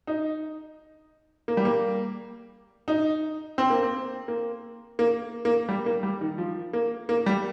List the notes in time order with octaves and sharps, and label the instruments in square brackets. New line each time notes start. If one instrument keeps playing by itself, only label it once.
[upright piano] D#4
A#3
G3
A#3
D#4
C4
A#3
C4
A#3
A#3
A#3
G3
A#3
G3
D#3
F3
A#3
A#3
G3